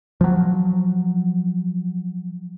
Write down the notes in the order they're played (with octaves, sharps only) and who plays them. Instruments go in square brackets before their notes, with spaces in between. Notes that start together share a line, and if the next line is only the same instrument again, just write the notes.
[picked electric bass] F3 F#3